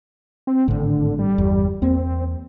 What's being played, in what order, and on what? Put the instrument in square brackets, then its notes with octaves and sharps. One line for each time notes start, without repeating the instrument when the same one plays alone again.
[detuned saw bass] C4
[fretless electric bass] G#1 A2 [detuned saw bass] D3
[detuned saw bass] G3
[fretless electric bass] G1 E2
[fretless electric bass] E2 A#3 [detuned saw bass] C4